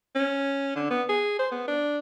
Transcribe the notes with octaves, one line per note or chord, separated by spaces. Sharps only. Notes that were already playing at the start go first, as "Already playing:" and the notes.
C#4
D3
B3
G#4
C5
B3
D4